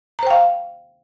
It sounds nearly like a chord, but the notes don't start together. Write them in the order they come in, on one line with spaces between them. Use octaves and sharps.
A#5 C5 G5 F5